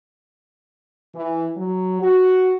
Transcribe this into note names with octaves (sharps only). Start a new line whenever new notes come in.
E3
F#3
F#4